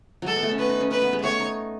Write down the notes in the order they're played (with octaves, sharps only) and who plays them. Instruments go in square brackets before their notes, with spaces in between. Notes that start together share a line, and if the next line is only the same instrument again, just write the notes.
[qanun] F#3 G#3 [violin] A4
[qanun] B3
A3
C#4
[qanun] B3 [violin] B4
[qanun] D#4
C#4
[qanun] C#4 [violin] B4
[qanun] B3
G#3
[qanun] A3 B3 [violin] C#5
[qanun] D#4